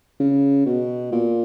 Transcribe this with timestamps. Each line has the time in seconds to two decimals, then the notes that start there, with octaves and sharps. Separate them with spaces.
0.20 C#3
0.66 B2
1.12 A#2